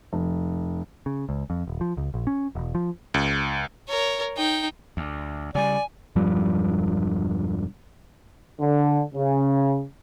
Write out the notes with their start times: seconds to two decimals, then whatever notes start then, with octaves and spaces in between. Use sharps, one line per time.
0.12 F1
1.06 C#3
1.29 C#2
1.50 F2
1.67 D#1
1.81 F3
1.97 C#2
2.14 A#1
2.27 C#4
2.55 E1
2.75 F3
3.14 C#2
3.88 A#4 C#5
4.37 D#4 G5
4.97 D2
5.55 C#3 G3 D5 G#5
6.16 E1 G2 F3 G3
8.60 D3
9.15 C#3